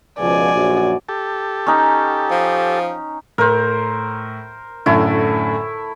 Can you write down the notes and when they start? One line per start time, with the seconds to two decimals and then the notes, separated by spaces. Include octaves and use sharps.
0.19 C#2 B2 F3 D5 G#5
0.54 A#1 F#2 F#4
1.09 G4 A4
1.66 C#4 D#4 G5
2.31 F3
3.38 A2 A#4 C5
4.86 F#2 A2 D3 A3 E4